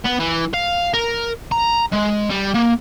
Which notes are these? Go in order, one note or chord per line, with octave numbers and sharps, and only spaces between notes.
B3
E3
F5
A#4
A#5
G#3
G3
A#3